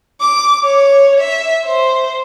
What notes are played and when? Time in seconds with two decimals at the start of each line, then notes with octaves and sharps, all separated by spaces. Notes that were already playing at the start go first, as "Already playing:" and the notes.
0.21 D6
0.64 C#5
1.20 E5
1.65 C5